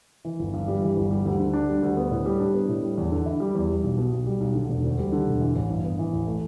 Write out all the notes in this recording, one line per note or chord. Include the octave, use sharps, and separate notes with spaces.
E3
G1
G2
G3
E3
G1
G3
D2
D3
D4
G3
D2
B3
A2
G3
D4
B3
A2
G3
E2
D3
E4
G3
E2
G3
B1
B2
B1
G3
B1
D3
E1
D2
G3
D3
E1
E3
A1
G2
B3
E3
A1
A3